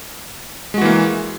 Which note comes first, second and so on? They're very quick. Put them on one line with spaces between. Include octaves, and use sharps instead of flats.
G#3 F#4 E3 A#3